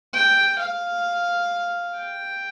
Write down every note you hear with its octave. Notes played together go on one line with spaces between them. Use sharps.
G5
F5
G5